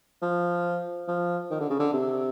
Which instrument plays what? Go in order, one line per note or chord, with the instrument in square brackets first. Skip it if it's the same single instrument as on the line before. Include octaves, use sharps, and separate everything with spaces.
[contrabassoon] F3
F3
D#3
D3
C#3
D3
C3